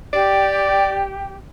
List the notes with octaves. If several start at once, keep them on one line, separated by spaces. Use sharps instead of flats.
G4 D5